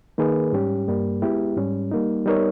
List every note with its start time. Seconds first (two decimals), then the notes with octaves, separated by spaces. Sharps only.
0.18 D#3 A#3 D#4 G#4 B4
0.52 G#2 G3 C#4 G4
0.88 G2 G3 A#3
1.22 G#3 B3 E4 G4
1.57 G#2 G3 C#4
1.91 G3 A#3 D#4
2.26 G3 B3 D#4 A#4 C#5